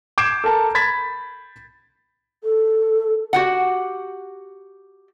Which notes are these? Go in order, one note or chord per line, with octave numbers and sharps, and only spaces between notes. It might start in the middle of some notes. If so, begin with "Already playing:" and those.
D6 G6 G#6 C7 D7 E7
A4 A#4 A5 A#5
B5 G#6 A6 B6
A4
F#4 G4 F#5